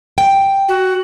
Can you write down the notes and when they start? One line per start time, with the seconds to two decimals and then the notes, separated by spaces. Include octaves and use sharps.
0.18 G5
0.68 F#4